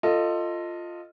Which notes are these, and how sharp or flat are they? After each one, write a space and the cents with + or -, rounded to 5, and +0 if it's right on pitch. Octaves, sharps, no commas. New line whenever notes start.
F4 +0 A4 +25 D#5 +0